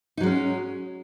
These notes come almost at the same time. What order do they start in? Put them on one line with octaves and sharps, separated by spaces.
D#4 F#3 G#3 C#4